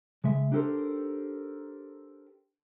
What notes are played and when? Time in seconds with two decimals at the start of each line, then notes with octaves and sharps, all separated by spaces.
0.24 C#3 G#3 E5
0.52 D4 D#4 G4 A4 A#4 C5